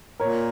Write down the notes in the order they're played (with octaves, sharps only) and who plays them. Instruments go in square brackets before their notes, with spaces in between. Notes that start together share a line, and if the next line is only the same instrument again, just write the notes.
[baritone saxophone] A#2 [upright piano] A#4 C#5